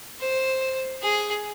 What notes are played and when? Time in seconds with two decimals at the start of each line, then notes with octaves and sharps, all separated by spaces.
0.20 C5
1.02 G#4